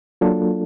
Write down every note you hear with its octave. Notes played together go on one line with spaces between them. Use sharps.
F#3 A#3 D4 F4 A4